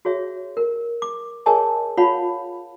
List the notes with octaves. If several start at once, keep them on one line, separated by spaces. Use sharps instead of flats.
F#4 G#4 C#5 E5
A#4
D6
G#4 A#4 C#5 D#5 G#5 A5
F4 C#5 F5 F#5 A5 B5